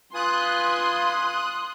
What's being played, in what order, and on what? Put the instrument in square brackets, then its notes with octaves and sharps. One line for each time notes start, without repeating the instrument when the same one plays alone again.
[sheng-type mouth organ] F4 B4 G#5 [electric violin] C6 [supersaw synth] D#6 F#6